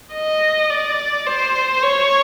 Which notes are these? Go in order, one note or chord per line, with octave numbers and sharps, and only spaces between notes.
D#5
D5
C5
C#5